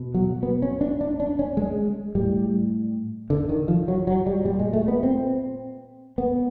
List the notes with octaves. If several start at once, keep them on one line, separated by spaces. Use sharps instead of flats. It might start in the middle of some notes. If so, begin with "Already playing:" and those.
Already playing: B2
F#3
B3
C#4
D4
D4
D4
C#4
G#3
A2 G3
D3
D#3
F3
F#3
F#3
G3
A#2 G3
G#3
A3
B3
C4
B3